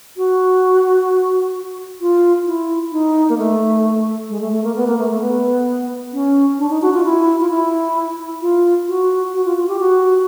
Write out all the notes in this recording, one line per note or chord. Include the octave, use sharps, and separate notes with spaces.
F#4
F4
E4
D#4
A#3
A3
G#3
A3
A3
A#3
B3
A#3
A3
A3
B3
C#4
D4
D#4
F#4
F4
E4
F4
E4
F4
F#4
F#4
F4
F4
G4
F#4